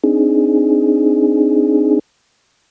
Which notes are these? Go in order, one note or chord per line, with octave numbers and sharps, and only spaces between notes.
C4 D4 D#4 G#4